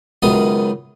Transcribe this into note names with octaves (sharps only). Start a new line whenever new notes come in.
C#2 F#2 D#3 B3 C6 D#6